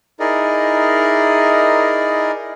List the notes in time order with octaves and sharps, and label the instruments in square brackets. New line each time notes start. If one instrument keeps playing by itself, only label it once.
[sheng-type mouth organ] D#4 E4 G#4 A#4 D5 D#5